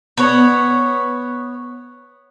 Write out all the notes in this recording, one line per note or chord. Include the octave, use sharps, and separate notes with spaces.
B3 C#5